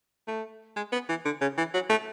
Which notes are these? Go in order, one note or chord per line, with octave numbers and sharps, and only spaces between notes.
A3
G#3
B3
E3
D3
C#3
E3
F#3
A3